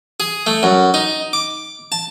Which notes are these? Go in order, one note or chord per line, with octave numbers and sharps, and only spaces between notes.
G#4
A3
F#2
D#4
D6
A5